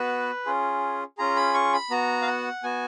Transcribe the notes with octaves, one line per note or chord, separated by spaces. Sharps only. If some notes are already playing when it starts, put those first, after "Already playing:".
Already playing: B3 F#4 B4
C#4 F4 G#4
C#4 F4 G#4 A#5
B5
C#6
B5
B3 F#4 A#5
F5
F#5
B3 F#4 G#5